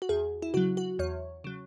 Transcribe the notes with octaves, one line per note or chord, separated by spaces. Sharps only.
F#4
E2 G#4
E4
C#3 F#3 F#4
F#4
E2 C#5
C#3 F#3